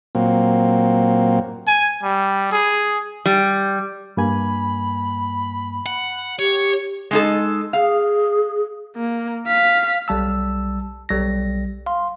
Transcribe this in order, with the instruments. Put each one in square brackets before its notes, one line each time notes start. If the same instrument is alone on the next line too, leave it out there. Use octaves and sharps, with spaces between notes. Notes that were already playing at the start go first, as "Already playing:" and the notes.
[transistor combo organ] A#2 F#3 A#3 C4
[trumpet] G#5
G3
G#4
[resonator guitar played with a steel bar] G3
[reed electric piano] G2 A#3 G#5 [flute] B5
[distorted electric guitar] F#5
[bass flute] G4 [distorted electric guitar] C#5
[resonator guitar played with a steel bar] G#3 D#4 A4
[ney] G#4 [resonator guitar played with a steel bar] F5
[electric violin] A#3
F5 B6
[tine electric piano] B1 G3 A5 E6
B1 G3 A#6
F5 C6